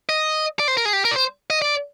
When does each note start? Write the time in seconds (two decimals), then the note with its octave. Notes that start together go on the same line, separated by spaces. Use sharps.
0.09 D#5
0.60 D5
0.68 C5
0.77 A#4
0.85 G#4
0.93 G4
1.05 A#4
1.11 D5
1.16 C5
1.50 D#5
1.62 D5